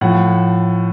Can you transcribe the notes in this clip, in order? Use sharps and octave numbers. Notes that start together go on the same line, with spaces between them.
A2 F3 F#5